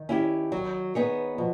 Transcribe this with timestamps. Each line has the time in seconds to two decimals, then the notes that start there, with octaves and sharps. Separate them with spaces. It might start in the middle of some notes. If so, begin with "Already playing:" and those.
Already playing: D#3
0.09 C#4 E4 G4
0.52 F#3
0.95 B3 D#4 G#4 C#5
1.38 B2 F3